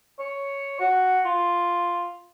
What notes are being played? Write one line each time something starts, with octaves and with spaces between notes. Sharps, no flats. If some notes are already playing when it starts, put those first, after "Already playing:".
C#5
F#4
F4